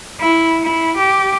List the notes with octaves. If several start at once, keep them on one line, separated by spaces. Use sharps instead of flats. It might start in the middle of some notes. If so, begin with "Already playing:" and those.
E4
E4
G4